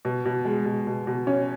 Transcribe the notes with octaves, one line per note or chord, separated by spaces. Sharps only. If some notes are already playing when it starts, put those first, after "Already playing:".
B2
B2
G#3
B2
B2
B2
C#4